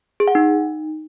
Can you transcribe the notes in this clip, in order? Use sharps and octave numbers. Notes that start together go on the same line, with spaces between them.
G#4
F#5
D#4